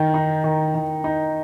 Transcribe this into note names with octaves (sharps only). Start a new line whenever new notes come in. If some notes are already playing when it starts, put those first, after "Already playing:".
Already playing: D#3 D#4
D#4
D#3
D#3
D#4